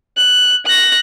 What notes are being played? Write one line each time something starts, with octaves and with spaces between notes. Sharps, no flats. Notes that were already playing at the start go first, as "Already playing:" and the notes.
F#6
F#6 A#6